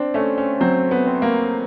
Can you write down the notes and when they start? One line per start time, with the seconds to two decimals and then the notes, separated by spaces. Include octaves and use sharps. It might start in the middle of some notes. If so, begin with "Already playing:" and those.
Already playing: C4 D4
0.14 A3 C#4
0.38 C#4
0.60 F#3 C4
0.91 B3
1.07 C4
1.22 A#3